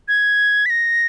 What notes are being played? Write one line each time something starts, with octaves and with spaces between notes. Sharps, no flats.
G#6
B6
A#6